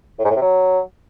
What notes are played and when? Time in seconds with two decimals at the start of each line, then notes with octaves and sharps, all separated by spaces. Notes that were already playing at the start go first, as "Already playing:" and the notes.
0.19 A2
0.24 G#2
0.30 A2
0.36 C3
0.42 F#3